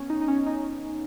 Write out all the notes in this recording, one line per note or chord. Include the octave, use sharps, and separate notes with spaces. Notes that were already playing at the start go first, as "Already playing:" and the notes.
Already playing: B3 C#4
D#4
D#4
C#4
D#4